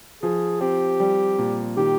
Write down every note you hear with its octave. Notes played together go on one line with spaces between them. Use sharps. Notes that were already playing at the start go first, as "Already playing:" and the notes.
F3 G#4
C4 G4
G3
A#2
D#3 G4